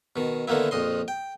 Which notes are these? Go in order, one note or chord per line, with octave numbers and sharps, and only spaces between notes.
B2 D#3
D3 D#3 A#3 B3 E4
A#1 F2 D#5 C6
G5